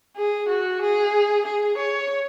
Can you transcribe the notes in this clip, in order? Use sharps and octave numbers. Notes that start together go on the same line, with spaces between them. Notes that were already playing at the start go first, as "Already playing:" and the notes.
G#4
F#4
G#4
G#4
C#5